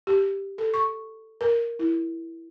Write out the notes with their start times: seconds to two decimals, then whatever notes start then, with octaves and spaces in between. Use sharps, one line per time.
0.07 G4
0.58 A4
0.74 C#6
1.41 A#4
1.79 E4